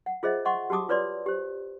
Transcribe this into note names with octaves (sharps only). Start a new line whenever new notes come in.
F#5
F4 G#4 C5 D#5 E5
D#5 F#5 C6 C#6
F#4 G4 A5 D6 D#6
F4 B4 C#5 D5 C6
G4 C5